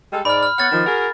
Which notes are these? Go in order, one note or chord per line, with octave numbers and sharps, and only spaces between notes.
G3 G#3 A4
G#2 D5 B5 F6
B5 F6
B3 C#5 F#5 F6 A6
D#3 F3
F#4 G#4 A#4